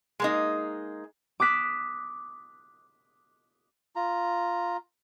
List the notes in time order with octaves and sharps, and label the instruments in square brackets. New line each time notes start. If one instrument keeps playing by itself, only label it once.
[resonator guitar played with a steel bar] G#3 A#3 D#4
[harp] D6 D#6 F#6 B6 E7
[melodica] F4 A#5